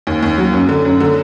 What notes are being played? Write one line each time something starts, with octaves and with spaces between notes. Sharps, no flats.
D#2
D#2
F#3
F#2
D3
F#2
D3